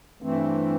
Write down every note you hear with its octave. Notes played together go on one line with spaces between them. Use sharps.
G2 E3 A3 C4